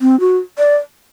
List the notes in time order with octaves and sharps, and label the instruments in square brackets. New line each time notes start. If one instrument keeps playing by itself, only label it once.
[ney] C4
F#4
D5